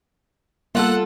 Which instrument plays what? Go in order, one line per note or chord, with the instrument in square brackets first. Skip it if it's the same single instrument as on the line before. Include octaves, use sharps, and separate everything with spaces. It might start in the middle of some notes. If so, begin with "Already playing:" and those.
[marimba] G3 B3 [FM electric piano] A#3 [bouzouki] F4 F#4 A4 [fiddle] F#5 F#6